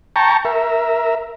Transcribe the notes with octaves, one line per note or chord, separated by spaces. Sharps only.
G5 A5 A#5 C#6
A#4 E5